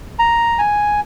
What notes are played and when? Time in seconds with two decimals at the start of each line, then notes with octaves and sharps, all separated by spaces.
0.19 A#5
0.59 G#5